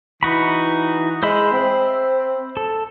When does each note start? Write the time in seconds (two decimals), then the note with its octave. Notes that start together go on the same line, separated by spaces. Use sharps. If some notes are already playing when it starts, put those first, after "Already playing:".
0.23 E3 D#4 F#4 B5
1.23 G#3 C5 E5 B5
1.52 C4
2.57 A4